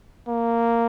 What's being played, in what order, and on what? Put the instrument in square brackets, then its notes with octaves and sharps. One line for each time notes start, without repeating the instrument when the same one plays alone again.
[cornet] A#3